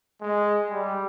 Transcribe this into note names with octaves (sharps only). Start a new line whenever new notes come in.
G#3
G3